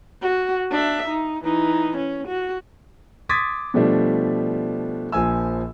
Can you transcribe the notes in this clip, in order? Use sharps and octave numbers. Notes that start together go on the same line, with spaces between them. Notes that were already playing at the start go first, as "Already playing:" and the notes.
F#4
D4 E5
D#4
E3 D#4
C#4
F#4
C6 D6 D#6 G#6 A6 B6
B2 F3 G3 A3 D4
A#1 F3 G#5 E6